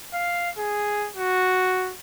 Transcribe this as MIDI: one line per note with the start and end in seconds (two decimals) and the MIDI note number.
0.14 0.50 77
0.58 1.09 68
1.16 1.93 66